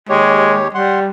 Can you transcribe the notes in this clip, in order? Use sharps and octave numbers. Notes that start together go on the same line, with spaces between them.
D#2 G#3 G4 C#5
G3 F#5 C6